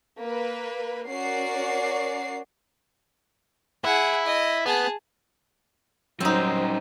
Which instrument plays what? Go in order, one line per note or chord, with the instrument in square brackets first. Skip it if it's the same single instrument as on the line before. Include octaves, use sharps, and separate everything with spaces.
[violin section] A#3 B4
C#4 F#4 A#4 D5 C7
[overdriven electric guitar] E4 [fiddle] G#4 F#5
[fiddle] D#5
[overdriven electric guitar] B3 [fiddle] G#4 A5
[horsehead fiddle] F#3 C5 [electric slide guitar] G3 C#4 [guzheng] C4 D#4